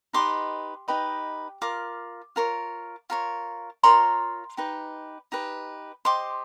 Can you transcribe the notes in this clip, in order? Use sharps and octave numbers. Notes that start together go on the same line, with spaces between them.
D#4 G4 B4 D#5 C6 D6
D#4 G4 B4 D#5
F4 A#4 D6
F4 A#4 C#5
F4 A#4 C#5
F4 A#4 C#5 A#5 C6
D#4 G4 B4
D#4 G4 B4
G4 C5 D#5 C6 D6